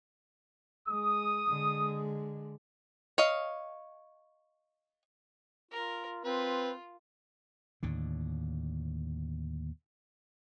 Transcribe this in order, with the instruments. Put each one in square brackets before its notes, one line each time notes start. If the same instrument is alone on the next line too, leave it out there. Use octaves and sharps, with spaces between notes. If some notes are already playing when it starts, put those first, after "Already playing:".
[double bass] G#3 [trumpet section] D#6
[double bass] D3 G#3
[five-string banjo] C#5 D#5 F5
[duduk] F4 [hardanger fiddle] A#4
[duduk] C4 [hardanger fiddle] F4 [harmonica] B4
[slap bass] D#2 A2 D3